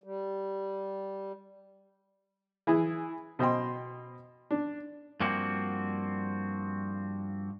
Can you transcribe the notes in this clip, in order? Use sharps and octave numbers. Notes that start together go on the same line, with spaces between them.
G3
E3 E4 G#4
B2 C5 D#5 G5 C6
D4
G2 F3 A#3 C4 F#4